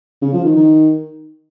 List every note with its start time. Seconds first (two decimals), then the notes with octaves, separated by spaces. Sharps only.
0.22 C#3
0.33 F3
0.44 D#3
0.55 D#3